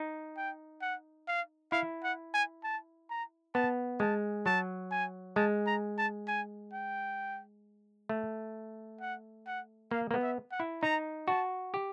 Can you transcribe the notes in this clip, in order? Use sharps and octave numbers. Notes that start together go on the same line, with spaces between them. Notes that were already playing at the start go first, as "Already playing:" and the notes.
Already playing: D#4
G5
F#5
F5
E4 F5
F#5
G#5
A5
A#5
B3 A5
G#3 A5
F#3 A5
G#5
G#3 A5
A#5
A5
G#5
G5
A3
F#5
F#5
A#3 F5
A#3
B3
E5
F#5
E4
D#4 A#5
F#4 A5
G4